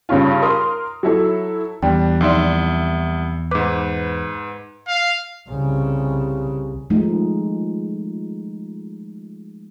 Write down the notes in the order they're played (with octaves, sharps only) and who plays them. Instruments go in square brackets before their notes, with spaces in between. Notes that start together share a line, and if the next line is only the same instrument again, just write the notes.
[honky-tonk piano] G2 C#3 C#4 F4
A#4 C6 D#6
F#3 E4 A4
[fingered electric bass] E2 [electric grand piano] G3 D4 [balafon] G5
[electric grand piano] C2 E5 [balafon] F3 D#4 D5
[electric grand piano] G#2 B4 [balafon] D6
[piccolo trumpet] F5
[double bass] C2 C#3
[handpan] F3 G#3 A3 D#4